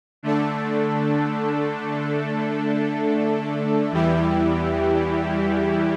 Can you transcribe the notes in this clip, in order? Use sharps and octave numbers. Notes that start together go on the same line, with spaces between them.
D3 A3 D4 A4
E2 E3 G3 E4 G4